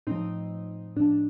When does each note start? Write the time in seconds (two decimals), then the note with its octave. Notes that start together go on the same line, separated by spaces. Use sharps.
0.07 A2 F3 C4 D#4
0.96 A2 F3 D4